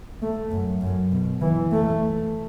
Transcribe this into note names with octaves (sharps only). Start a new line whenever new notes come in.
A3
F#2
F#2
B2
E3
A3